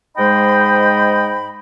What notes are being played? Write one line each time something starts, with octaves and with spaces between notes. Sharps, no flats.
G#2 G#3 C5 D#5 G5 B5